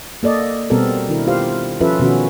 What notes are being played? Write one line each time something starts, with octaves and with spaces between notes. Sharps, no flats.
A#3 A4 D5 D#5
B2 G3 B3 C4 A4 A#4
D#3 D4 E4 A#4
F4 G4 C5 F5
F3 C#4 F4 A4 B4 E5
B2 D#3 C#4 F#4